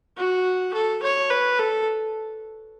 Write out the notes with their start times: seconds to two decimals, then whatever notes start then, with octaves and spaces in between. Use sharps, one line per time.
0.17 F#4
0.73 A4
1.02 C#5
1.30 B4
1.59 A4